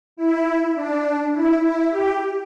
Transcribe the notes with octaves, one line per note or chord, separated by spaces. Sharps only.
E4
D4
E4
E4
G4